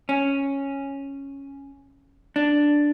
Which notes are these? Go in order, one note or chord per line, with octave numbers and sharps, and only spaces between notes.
C#4
D4